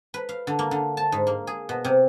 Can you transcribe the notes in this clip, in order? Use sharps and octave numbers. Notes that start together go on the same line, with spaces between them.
B4
F5
D3
A#3
D3
A5
G#2
A#3
G#4
B2
C3